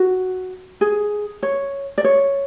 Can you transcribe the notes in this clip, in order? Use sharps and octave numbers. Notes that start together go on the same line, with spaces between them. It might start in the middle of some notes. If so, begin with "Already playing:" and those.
Already playing: F#4
G#4
C#5
D5
C#5